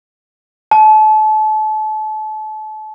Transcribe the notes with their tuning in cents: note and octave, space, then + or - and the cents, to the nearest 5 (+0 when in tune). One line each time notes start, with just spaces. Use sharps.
A5 -35